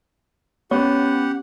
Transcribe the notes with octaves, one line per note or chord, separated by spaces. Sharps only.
B3 C#4 G4 C#5 F#5